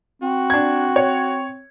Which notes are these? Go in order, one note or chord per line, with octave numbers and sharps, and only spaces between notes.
C4 F#4
D4 G#6
C#5